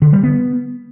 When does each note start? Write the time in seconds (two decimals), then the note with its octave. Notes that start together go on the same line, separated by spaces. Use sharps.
0.02 D3
0.13 G3
0.23 B3